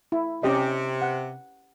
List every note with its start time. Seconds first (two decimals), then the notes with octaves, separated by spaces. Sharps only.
0.12 E4
0.43 C3 C#4 G4 D#5
1.02 F#5